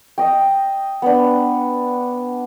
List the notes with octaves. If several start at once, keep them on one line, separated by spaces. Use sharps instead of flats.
D#5 G5
B3 D4